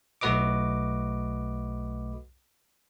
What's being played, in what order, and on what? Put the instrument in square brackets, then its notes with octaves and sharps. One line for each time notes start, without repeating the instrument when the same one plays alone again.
[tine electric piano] B1 A3 F#4 B4 D#5 D6